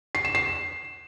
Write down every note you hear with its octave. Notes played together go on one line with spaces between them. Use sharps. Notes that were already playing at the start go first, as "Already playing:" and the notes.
C7
E7
C7